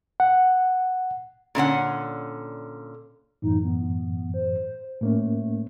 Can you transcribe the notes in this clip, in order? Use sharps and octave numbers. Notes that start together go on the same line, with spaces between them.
F#5
A#2 D3 C#4 F#5
F#2 A2 E3 D#4
B3
C5
A2 A3 A#3 C#4